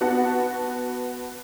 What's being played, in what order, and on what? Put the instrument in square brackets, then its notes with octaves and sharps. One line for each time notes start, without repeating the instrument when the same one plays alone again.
[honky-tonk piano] B3 F#4 F#5 A5